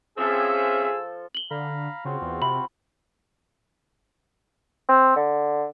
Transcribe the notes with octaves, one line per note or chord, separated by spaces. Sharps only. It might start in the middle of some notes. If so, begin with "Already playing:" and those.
F3 C4 C#4 G#4 A4 E5 E6
F#7 G7
D3 F5 A#5 B5
C#3 C4 F4 F#4
E2
C3 B5
C4
D3